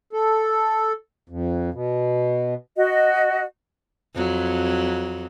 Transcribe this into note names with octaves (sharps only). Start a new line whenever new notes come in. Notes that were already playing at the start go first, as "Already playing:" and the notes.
A4
F2
B2
F#4 D#5
F2 F#3